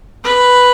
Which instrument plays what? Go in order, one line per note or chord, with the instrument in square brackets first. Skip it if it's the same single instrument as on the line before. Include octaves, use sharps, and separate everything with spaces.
[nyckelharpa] B4